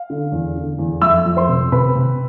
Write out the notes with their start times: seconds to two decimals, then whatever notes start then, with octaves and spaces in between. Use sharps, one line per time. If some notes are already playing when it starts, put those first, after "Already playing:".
Already playing: F5
0.10 D3
0.32 E2
0.55 D3
0.79 E2
1.02 F2 E5 E6
1.25 F2
1.37 C5 C6
1.49 C3
1.72 C3 B4 B5
1.95 C3